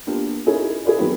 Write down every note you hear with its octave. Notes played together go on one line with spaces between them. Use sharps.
A#3 B3 D4 F4 G4 A#4
C#4 D#4 E4 G#4 A#4 C#5
E4 G#4 B4 D5
D#3 F#3 B3 C4 F#4 B4